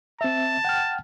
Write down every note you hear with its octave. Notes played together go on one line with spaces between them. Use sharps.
C4 E5 A5
F#5 G5 F6